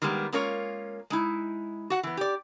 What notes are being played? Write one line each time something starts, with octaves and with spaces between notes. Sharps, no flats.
D#3 G3 G#3 A#3 B3
G#3 A#3 C#4 F4 A#4 C#5
G#3 D#4 E4
F#4 F#5
E3 B3
G4 D5